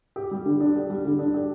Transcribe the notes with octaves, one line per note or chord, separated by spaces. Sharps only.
G4
G3
D3
D4
G4
G3
D3
D4
G4